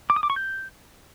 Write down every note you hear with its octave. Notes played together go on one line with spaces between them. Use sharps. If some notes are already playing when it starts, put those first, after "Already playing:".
D6
D#6
D6
C#6
G6